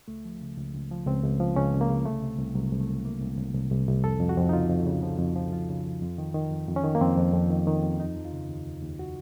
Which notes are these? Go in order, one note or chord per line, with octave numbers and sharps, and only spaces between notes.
C#2 A3
F3
C#3
C#2
C#2
F3
C#2 C4
C#2
F3
C#2 C#4
C#2
A#3
C#3
C2 A3
C3
C2
C2 F#3
C2
A3
C2
C3 A#3
C2
C2
C2
C2
C2
F2 A4
F2
F#4
F2
D#4
C#3 F4
F2
C#3
F3
F2
F3
F2 F4
C#3
F2
F2
D#3
D#3
F2
F2
C#4
D#3
A#3
F2 C4
F2
F2
D#3
D#3
F2
D#2 D#4
F3
F4
C#3
D#2
D#2
D#2
F#4